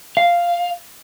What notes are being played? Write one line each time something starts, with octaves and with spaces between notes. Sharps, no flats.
F5